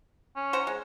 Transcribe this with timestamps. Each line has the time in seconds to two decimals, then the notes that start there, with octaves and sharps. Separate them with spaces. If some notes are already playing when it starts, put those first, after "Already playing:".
0.36 C#4
0.53 C5 F#5 A#5
0.67 G#3